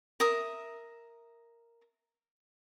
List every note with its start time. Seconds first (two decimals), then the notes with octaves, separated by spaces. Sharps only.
0.20 A#4 E5 D#6